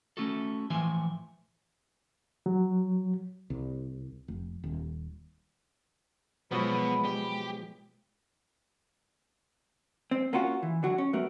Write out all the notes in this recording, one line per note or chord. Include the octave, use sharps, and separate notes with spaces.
A3 C#4 E4 F#4 A4
A2 E3 F3 E5 G#5 C6
F#3
C2
F1
D#1
B2 F3 F#3 G#3 B3 F#4 B5
G4
C4
A#3 C#4 F4 F#4
E3
D3 F#3 F#4
C#4
F#3 A3 B3 F#4 A#4